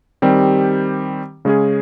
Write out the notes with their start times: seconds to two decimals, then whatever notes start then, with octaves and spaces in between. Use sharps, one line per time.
0.22 D#3 G3 C4 G4
1.45 C#3 G#3 C#4 G#4